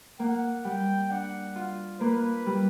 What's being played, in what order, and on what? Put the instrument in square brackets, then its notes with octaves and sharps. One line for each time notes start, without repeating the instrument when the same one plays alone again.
[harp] A#3 [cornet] F#5
[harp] G3 [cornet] G5
[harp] D4 [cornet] F#5
[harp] F4
[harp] A#3 [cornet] B4
[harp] G3